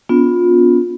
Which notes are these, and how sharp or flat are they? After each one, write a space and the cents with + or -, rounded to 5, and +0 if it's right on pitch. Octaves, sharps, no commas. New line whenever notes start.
B3 +0 D4 -35 F4 +25